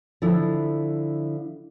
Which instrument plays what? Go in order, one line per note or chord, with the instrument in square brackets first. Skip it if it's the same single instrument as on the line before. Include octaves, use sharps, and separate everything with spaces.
[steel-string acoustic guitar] D3 F3 E4